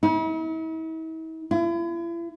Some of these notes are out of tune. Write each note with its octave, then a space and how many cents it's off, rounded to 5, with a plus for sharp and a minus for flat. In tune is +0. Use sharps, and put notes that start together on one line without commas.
E4 -45
E4 +40